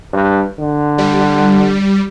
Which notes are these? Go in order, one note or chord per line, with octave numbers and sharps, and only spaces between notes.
G2
D3
G3